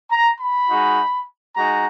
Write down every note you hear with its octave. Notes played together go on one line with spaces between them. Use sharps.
A#5
B5
G#3 D#4 F#4
G#3 D#4 F#4 A#5